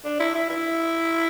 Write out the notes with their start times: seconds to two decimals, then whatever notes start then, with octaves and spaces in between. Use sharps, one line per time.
0.05 D4
0.20 E4
0.35 E4
0.50 E4